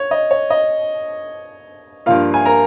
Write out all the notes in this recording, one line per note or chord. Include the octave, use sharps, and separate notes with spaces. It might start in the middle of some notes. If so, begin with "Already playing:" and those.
Already playing: C#5
D#5
C#5
D#5
G2 F3 A#3 F4 F5
G#5
A#4 A#5